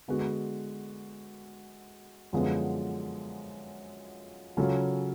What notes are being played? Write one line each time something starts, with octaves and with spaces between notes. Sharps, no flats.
D3 G#3 B3 F#4
F#2 D3 F3 G#3 B3
C#3 F#3 C#4 F4 A4